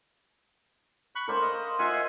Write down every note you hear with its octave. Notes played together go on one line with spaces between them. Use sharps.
B5 C#6 F#6
C#4 D4 A#4 C5 F5
D#5
F4 D#5 E5 F#5 G#5